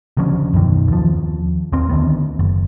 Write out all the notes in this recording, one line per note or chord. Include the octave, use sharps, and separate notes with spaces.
D2 C#3 F3 C#4
F#2 B2 D#3
D#2 F3
D#2 C4
D2 D#3 B3
F#1